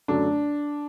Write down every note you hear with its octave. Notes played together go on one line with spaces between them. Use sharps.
F#2 D3 F#3 A3 D4